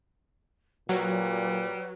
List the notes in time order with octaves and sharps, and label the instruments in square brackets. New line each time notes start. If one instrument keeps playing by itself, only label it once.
[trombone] A#2 [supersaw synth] F#3 [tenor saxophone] G3 [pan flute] B4